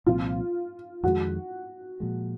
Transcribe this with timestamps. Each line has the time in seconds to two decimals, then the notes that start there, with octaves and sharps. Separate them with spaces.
0.06 C2 A#2 F3 C4 F4
1.03 F2 D#3 G#3 F#4
2.00 A#2 F3 G#3